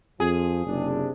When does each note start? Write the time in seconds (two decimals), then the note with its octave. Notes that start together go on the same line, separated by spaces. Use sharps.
0.20 F2 F3 G#4
0.66 F#1 C3 D4